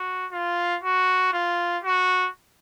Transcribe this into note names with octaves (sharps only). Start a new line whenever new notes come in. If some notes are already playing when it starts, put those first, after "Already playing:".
Already playing: F#4
F4
F#4
F4
F#4